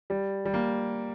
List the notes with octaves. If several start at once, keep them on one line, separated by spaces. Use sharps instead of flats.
G3
G3
A#3